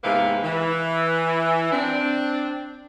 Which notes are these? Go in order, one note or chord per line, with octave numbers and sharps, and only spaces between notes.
E2 G#2 C3 A#3 B4 F5
E3
C4 D4